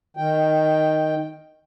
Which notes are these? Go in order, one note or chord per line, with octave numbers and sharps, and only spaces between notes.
D#3 G5